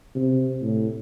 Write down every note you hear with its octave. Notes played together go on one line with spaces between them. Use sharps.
C3
A2